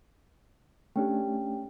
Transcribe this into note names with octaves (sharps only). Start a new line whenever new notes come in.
A3 C#4 D4 G4 G5